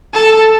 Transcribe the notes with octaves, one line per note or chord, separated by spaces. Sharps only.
A4